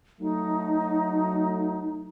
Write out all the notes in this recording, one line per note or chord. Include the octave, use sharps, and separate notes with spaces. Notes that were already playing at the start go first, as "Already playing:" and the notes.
F#3 A3 D#4